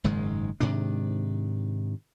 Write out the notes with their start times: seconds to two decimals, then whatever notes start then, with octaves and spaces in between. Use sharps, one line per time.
0.04 F#1 G#2 D#3 G#3
0.60 G#2 C3 D#3 D4